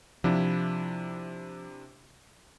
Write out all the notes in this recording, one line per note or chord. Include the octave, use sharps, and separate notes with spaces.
C3 F3 D4 E4